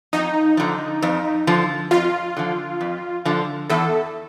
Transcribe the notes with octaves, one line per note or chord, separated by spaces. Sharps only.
F2 D#4
D3 F3
F2
D3 F3
F2 F4
D3 F3
F2
D3 F3
E2 A4